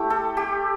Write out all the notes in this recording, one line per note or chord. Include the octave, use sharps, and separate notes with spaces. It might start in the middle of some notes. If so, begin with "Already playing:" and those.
Already playing: A3 E4 G4
A4
G4